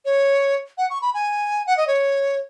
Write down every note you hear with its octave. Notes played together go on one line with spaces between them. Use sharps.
C#5
F#5
C#6
B5
G#5
F#5
D#5
C#5